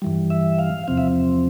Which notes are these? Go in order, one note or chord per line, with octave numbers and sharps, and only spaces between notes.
G2 E3 G3
E5
F5
E2 C3 F3 C4 F5
E5